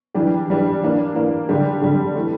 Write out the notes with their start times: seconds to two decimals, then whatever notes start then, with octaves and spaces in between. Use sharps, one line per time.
0.14 E3 G3 D4 G4
0.48 E3 G3 D4 G4
0.82 E3 A#3 D4
1.15 E3 A#3 D4
1.49 D3 G3 D4 G4
1.82 D3 G3 D4 G4
2.15 E3 A3